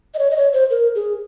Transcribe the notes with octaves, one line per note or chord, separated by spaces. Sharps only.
D#5
C#5
D#5
C#5
C5
A#4
G#4